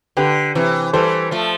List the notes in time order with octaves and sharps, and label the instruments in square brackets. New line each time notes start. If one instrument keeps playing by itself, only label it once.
[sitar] D3 [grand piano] G4 B4
[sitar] C3 E3
[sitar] E3 G3 [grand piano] A4 C5
[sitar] F3 A3